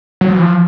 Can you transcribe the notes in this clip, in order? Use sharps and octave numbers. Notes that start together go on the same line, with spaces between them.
F#3
F3
E3
F3